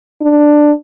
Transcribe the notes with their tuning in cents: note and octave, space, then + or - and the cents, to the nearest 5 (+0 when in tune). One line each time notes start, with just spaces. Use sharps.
D4 +10